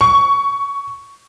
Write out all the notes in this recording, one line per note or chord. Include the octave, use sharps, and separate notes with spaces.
C#6